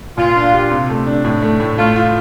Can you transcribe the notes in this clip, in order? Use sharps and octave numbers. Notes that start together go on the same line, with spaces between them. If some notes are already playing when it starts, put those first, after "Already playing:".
A#2 F4
D4
G4
C3
A3
D4
A2
A3
A2
A3 F4
F4